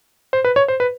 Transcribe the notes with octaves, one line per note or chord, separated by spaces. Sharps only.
C5
B4
C#5
C5
B4